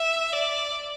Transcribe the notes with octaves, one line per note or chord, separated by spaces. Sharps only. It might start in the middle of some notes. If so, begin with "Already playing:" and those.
Already playing: E5
D5